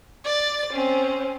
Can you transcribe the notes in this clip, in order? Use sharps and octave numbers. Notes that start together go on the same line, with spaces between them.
D5 A6
C4 C#4